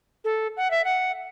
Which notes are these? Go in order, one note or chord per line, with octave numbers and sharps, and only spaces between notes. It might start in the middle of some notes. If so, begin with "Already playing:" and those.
A4
F#5
E5
F#5